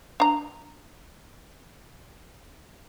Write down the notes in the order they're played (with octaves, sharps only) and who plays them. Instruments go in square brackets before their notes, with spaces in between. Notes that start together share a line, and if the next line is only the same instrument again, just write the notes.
[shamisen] D4 A#5